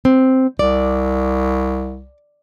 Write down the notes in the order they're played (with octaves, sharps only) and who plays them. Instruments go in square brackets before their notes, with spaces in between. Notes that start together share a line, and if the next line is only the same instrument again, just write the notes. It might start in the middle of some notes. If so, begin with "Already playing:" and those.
[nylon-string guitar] C4
[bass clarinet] C2 [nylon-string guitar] D5